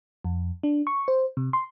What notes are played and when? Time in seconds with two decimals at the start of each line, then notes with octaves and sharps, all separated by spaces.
0.24 F2
0.63 D4
0.87 C#6
1.08 C5
1.37 C3
1.53 C6